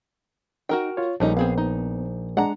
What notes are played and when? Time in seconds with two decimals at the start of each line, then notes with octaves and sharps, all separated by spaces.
0.69 D#4 F#4 A#4 G5
0.97 F4 C#5
1.20 A#1 G3 A3 C#4 D#4
1.37 B3 C4 G#4 F5
1.58 D#4
2.37 G#3 D4 F#5 A#5